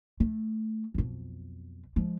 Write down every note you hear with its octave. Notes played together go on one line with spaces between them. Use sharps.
A3
B1 F2
F3 G#3